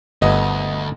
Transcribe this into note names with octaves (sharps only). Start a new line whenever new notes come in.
G1 D2 A3 B3 D#5